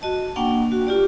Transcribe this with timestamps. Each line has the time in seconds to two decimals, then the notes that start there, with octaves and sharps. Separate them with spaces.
0.02 F#4 D#5 A5
0.36 A#3 D4 F#5 G5 C#6
0.72 F#4
0.87 F4 G4 D5